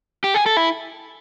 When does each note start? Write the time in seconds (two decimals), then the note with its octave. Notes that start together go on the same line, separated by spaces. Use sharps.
0.24 G4
0.34 G#4
0.46 A4
0.57 E4